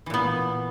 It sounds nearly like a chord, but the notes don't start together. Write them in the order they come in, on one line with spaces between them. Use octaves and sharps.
E3 A#2 B3